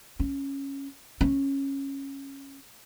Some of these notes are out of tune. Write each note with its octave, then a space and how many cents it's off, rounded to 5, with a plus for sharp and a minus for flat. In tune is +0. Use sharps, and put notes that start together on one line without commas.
C#4 -5
C#4 -15